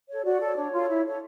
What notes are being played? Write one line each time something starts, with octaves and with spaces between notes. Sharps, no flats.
A4 C#5
F#4 D5
A4 C#5
D4 C#5
F4 A4
E4
A4 C#5